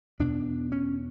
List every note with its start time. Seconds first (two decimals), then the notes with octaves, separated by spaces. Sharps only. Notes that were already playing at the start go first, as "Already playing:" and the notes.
0.20 E2 B2 D4
0.72 C#4